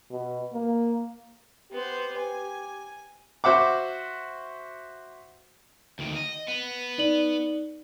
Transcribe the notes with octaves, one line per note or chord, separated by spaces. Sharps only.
B2
A#3
B3 G4 C5
G#5
F#4 C5 E5 F#5 D6
D2 D#3
D#5
B3
D#4 D5 F#7